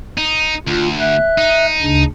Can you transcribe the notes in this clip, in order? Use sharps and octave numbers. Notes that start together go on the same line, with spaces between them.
D#4
D2 F4
E5 F#6
D#4
D2 C#3 D4